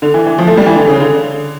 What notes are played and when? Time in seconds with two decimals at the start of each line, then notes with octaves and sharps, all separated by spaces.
0.02 D3
0.14 E3
0.26 E3
0.38 F3
0.47 A3
0.57 G3
0.66 E3
0.75 D3
0.87 C#3
1.00 D3